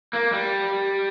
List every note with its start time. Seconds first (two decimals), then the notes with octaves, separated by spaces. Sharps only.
0.13 A#3
0.32 G3